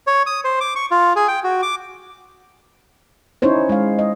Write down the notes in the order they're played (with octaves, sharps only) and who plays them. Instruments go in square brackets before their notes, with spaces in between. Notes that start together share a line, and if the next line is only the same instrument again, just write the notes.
[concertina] C#5
D#6
C5
D6
C#6
F4
G#4
G5
F#4
D6
[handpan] C#4 D#4 E4 C5 C#5
G#3 F5
D#5